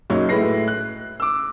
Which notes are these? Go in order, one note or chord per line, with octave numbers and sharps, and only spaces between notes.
F#1 F#3 D#4 C#5
A2 G#3 E4 B4 A#6 C7
F#6
D6 E6